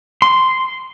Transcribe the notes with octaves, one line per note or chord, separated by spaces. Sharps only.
C6